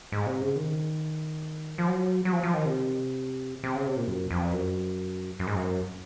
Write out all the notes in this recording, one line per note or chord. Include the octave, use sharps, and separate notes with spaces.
G#2
C3
C#3
D#3
F3
F#3
F#3
F3
F3
D#3
C3
C3
C#3
C3
A#2
F#2
F2
F#2
F#2
G#2
F#2